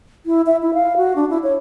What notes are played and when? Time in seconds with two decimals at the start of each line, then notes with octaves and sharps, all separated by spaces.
0.26 E4
0.46 E5
0.62 E4
0.74 F5
0.97 F#4
1.16 D4
1.30 E4
1.43 C#5